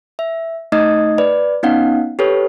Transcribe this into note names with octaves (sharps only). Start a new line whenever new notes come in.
E5
A3 D#4 D#5 D#6 G#6
B4 D5
B3 C#4 D#4 F5 F#5
G4 A4 B4 C#5